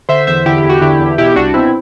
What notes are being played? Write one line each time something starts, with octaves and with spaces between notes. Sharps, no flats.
D3 C5 E5
E2 C5 E5
D3 E4 G4
E4
E2
F#4
D3 E4 G4
E2
B2 E4 G4
C2 D4 F#4
B2 C4 E4